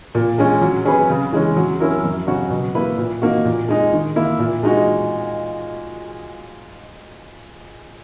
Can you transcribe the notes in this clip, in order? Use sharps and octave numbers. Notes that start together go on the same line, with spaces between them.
A#2
G#3 C#4
F#3
C#4 G#4 B4
C#3
E3 G#3 C#4
F#3
C#4 E4 A#4
F#2
C#3 F#3 C#4 F#4
B2
A#3 E4 B4
A#2
A#3 D#4 F#4
A#2
G#3 D#4
D#3
A#3 E4
A#2
G#3 D#4 F#4